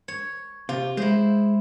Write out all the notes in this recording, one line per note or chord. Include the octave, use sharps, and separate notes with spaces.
C#5
C3 F4
G#3 E4 C5